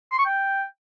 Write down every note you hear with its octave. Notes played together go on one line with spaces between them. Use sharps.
C6
C#6
G5